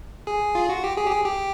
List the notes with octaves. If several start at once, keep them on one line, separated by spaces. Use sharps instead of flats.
G#4
F4
F#4
G4
G#4
G4
G#4
G4